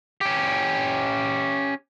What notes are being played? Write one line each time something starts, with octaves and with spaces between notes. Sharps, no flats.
C#4 G4